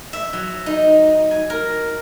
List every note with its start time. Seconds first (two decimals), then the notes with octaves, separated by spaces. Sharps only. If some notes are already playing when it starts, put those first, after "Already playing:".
0.13 E5
0.33 F#3
0.66 D#4
1.31 G#5
1.50 A#4